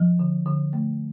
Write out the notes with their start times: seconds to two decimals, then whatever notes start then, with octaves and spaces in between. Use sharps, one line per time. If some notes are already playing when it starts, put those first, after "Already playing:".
Already playing: F3
0.19 D3
0.46 D3
0.73 A3